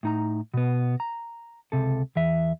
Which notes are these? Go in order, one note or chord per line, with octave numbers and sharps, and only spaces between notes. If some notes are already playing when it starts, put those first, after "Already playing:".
A2 D#4 A#5
B2 B3
A#5
C#2 C3 A4
E2 E3 E5